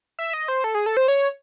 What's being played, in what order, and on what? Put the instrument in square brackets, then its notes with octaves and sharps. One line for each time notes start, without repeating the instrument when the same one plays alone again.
[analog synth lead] E5
D#5
C5
A4
G#4
A4
C5
C#5